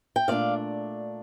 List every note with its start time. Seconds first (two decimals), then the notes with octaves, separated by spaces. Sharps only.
0.16 G5
0.28 A#2 A3 D4 D5 F5